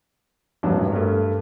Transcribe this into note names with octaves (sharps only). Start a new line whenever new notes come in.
E1 A1 G2 F#3
A3 A#4